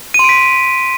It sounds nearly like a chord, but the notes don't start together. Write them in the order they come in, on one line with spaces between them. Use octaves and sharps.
D#7 C6 D7 B6